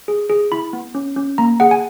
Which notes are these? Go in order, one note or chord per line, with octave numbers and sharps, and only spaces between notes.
G#4
G#4
E4 B5
B3
C#4
C#4
A#3 A#5
G#4 F#5
G#5